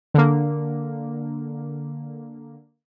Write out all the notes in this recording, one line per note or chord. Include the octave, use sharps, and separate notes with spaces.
D3 A#3